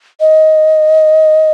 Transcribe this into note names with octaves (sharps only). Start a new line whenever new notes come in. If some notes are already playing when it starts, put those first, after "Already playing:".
D#5